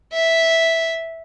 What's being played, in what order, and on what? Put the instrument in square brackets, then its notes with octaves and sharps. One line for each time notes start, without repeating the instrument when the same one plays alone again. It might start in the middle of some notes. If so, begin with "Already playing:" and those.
[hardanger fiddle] E5